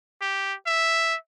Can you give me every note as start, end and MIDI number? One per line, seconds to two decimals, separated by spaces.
0.21 0.54 67
0.66 1.15 76